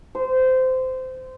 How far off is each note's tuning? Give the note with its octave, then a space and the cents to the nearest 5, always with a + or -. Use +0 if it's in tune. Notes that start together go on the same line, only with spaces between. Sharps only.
C5 -20